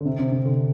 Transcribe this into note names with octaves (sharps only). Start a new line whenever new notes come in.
D3
C3
C3
C3
D3